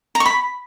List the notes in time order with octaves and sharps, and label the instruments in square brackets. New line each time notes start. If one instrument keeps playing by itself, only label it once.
[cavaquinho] A#5
C#6
B5